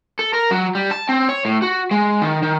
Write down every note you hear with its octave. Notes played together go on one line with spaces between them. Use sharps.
A4
A#4
F#3
G3
A5
C4
C#5
A2
F#4
G#3
D#3
D#3